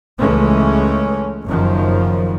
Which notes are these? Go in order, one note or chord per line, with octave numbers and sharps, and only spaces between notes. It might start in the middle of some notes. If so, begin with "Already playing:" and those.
C#2 E3 G#3 A3 C#4
F#1 F#2 D#3 F3